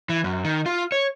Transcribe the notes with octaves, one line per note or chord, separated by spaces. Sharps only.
E3
F#2
D#3
F4
C#5